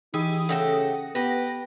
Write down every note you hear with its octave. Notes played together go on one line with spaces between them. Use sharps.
E3 D#4 G4 G#4 D#6
C#3 A3 G4 A4 F#5 D#6 A#6
B3 G4 B4 A#6